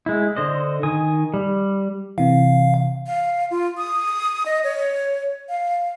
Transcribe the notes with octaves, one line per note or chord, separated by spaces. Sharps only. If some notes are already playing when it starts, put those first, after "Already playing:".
G#3 E4
D3 C5 D#5
D#3 G#5 D#6
G3
C3 E3 F5
F5
F4
D#6
D#5
C#5
F5